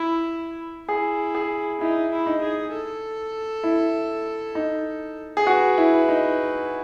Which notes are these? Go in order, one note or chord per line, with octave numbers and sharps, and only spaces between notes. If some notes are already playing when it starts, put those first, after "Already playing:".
Already playing: E4
E4 G#4
G#4
D#4 E4
E4
D#4
G#4
A4
E4
D#4
G#4
F#4 B4
E4
D#4